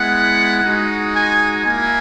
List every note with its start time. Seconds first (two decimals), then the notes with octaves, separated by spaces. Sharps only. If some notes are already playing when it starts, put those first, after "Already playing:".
Already playing: G#3 B3 E4 F#5
0.62 G#3 D#4 F#4
1.14 G#5
1.66 A#3 E4 G#5